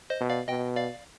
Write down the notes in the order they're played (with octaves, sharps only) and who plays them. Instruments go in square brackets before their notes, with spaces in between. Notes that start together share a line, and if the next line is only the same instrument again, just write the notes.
[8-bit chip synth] C5 D#5
[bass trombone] B2
[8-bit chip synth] D5 F5
[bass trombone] B2 [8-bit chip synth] D#5 G5
[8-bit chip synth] D5 F5